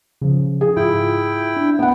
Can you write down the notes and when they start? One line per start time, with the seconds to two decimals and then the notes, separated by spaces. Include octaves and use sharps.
0.21 C#3 F3
0.61 G#4
0.76 G#2 E4 F4 G5
1.56 D4
1.79 B3 F#5